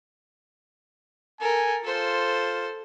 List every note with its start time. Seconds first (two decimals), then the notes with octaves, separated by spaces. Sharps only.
1.41 A4 A#4 G#5
1.84 F4 A4 C5